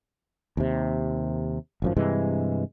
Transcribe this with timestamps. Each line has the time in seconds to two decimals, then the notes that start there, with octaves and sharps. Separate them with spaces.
0.57 D#2 C3
1.82 G#1 F#2 F3
1.96 G2 C3 E3 G#3